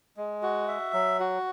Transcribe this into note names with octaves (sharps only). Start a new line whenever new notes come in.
G#3
F#4
E5
F#3
F#4